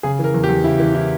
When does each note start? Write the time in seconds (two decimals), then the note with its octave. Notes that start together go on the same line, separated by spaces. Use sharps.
0.03 C#3 G#4
0.19 E3 A#4
0.34 E2
0.44 G4
0.49 E2
0.64 C#3 E4
0.80 E3
0.95 E4